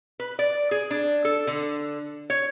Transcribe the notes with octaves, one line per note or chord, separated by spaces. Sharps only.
B4
D5
G#4
D4
A4
D3
C#5